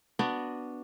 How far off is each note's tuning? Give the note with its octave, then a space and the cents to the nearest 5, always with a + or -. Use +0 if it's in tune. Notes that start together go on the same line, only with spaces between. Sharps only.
B3 +0 D4 +0 F#4 +0